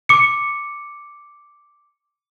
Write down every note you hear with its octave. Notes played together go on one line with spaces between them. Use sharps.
D6 C#7